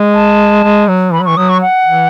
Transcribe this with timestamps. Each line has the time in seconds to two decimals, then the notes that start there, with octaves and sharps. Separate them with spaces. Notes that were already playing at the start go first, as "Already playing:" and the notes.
Already playing: G#3
0.14 A5
0.63 G#3
0.88 F#3
1.12 E3 B5
1.20 F#3
1.25 E3 C#6
1.37 F#3 D#6
1.49 C#6
1.62 F#5
1.86 E3